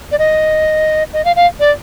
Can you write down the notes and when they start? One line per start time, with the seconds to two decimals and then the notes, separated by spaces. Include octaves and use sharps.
0.12 D5
0.19 D#5
1.13 D#5
1.25 F5
1.36 F5
1.60 D5